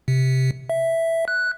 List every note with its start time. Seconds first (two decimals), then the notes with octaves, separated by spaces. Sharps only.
0.08 C3
0.70 E5
1.28 F#6